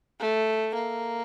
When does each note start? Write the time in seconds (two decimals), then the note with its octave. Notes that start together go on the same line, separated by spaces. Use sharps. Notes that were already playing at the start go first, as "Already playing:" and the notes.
0.20 A3
0.75 A#3